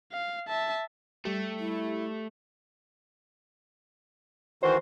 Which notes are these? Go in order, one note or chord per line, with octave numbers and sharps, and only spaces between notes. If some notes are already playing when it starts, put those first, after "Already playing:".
F5
E5 A5
G3 A3 G4
E4
D#3 E3 F#4 C5